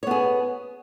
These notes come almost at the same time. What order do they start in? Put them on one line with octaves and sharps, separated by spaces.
C#5 B3 G#4